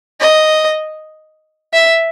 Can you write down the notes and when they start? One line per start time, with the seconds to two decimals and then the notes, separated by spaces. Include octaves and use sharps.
0.21 D#5
1.74 E5